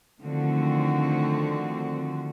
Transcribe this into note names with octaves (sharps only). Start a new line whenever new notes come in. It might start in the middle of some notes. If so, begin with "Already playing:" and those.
D3 D#3 F3 A3 C4 F#4